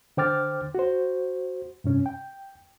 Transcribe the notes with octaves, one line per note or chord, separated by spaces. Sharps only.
D3 C5 G5 D6 F6 A6
F#4 C5
G2 C3 C#4
G5